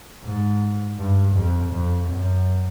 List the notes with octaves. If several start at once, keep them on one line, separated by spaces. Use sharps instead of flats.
G#2
G2
F2
F2
F#2